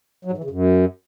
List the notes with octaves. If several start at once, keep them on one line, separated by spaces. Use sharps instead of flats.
F#3
G#2
E3
C#3
F#2